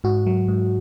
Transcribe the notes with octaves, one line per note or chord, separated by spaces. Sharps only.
G#2 F#4
F#3
G#2